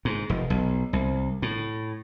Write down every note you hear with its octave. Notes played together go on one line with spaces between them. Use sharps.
G#2
F1
B1
C2
A2